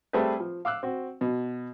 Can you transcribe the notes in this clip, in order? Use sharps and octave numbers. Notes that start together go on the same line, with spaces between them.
G3 A3 C4 G#4 B4
F3
F5 D6 E6 F#6
C4 F#4
B2